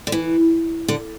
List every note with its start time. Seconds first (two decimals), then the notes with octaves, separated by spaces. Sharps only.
0.07 D3
0.12 E3
0.88 D3